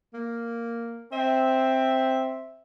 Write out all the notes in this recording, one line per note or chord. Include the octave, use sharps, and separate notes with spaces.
A#3
C4 E5